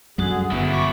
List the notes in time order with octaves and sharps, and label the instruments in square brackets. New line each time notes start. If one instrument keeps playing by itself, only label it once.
[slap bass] F#2 G3 [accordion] D3 G#4 [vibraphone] F#4 F#5
[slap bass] G1 [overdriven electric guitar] B2 E4 [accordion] E3
[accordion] C#6 D6